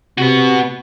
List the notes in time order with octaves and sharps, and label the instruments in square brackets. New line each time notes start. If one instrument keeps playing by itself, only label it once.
[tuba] C3 [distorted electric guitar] B3 F#4